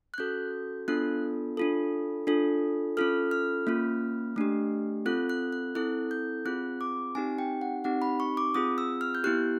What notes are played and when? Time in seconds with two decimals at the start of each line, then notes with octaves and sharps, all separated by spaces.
0.14 F#6
0.18 C#4 F#4 A4 G6
0.88 B3 D4 F4 A4 F#6
1.57 D4 F4 A4
2.27 D4 F4 A4
2.97 C#4 F4 A4 F6
3.31 F6
3.67 A#3 C#4 F4
4.36 A3 D4 G4
5.06 C4 F4 A4 F#6
5.30 F#6
5.53 F#6
5.75 C4 E4 A4 F#6
6.11 G6
6.45 C4 F4 G#4 F#6
6.81 D6
7.15 C4 D#4 G4 G#5
7.38 G5
7.61 F#5
7.84 C4 D#4 G4 F#5
8.02 B5
8.20 C#6
8.37 D6
8.55 C4 F4 G#4 D#6
8.78 E6
9.01 F6
9.15 G6
9.24 B3 E4 G4 F#6